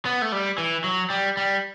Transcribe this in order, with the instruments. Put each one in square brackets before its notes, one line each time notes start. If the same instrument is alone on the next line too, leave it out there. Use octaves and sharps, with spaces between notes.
[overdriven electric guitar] B3
A3
G3
E3
F#3
G3
G3